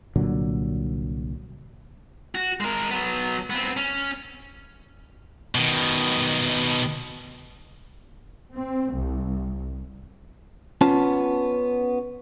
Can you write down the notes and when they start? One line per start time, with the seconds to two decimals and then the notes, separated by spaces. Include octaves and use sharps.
0.16 C2 A#2 D3 F#3
2.35 F#4
2.60 G#3 A#4
2.91 F#3 B3
3.50 B3 C4
3.77 C#4
5.55 B2 D#3
8.53 C4
8.93 C2
10.81 B3 C#4 F4 A5